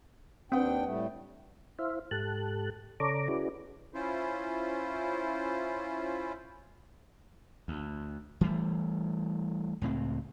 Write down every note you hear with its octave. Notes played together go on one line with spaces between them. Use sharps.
D#2 C4 D4 B4 F#5 G5 D#6
A2 G3 A3
E4 C5 E5 F5
G#2 G4 A4 A5 F#6
C#3 A4 C#5 D5 A#5 D6
C#4 E4 F#4 G#4 B4 D5
C#4 E4 F4 C5
D2
E3 G3 A3
C#2 A2 G#3 C4